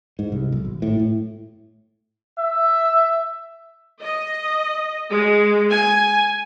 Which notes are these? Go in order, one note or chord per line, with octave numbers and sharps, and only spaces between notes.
G#2
C2
B1
G#1
A2
A2
E5
D#5
G#3
G#5